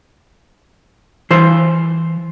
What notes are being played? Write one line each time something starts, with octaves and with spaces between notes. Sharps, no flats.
E3 C5